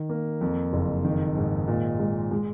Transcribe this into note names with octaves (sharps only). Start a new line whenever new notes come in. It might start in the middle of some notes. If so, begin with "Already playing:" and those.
Already playing: D#3
A#3
F2
F#1
D#3
G#2
A#2
G#3
G#3